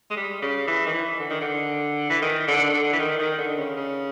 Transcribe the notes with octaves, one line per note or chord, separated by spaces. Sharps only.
G#3
G3
C#3
E3
D#3
E3
D3
D#3
D3
E3
D#3
D3
D3
E3
D#3
D#3
D3
C#3
C#3